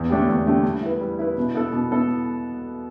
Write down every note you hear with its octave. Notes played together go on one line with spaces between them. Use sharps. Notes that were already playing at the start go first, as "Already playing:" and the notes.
Already playing: E2
D3 A3 D4 G4
E2
D3 A3 D4 G4
G3
E4 B4
G3
E4 B4
B2
B3 E4 A4
B2
B3 E4 A4